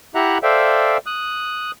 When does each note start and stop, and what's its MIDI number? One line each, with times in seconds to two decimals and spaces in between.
0.15 0.38 64
0.15 0.38 67
0.15 0.38 76
0.15 0.38 78
0.15 0.38 82
0.15 0.38 90
0.43 0.98 69
0.43 0.98 72
0.43 0.98 74
0.43 0.98 76
0.43 0.98 77
0.43 0.98 79
1.06 1.71 87
1.06 1.71 90